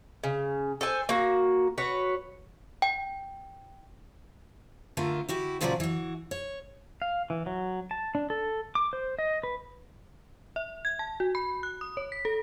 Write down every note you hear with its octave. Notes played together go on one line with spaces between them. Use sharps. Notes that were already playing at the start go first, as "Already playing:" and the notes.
C#3
A4 C5 G#5
A#3 F#4
F#4 B4 C#5
G5
D3 A3 F4 A#4
E4 F#4 G4
A#2 C#3 F3 F#3 B4 D5
E3 F#4
C#5
F5
E3
F#3
A5
D4
A4
D6
C5
D#5
B4
E5
G#6
A5
F#4
B5
F#6
D#6
C#5
B6
A4